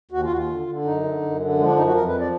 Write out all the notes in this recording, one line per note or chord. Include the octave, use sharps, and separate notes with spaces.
D#2 F#4
F4
D#2 F#4
F4
D3
D3
F#2 D#4
D3
F#2
D3
F3 G#3
D4
F#2 D#4
F#4
F2 A#4
B4
F3
D5